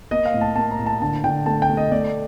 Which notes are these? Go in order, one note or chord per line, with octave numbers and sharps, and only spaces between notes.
A#3 D#5
F5
A2
A5
A#3 A5
A#5
A2
A5
D3 A5
D3 G5
A3 A5
G5
A3
D#5
A3 D5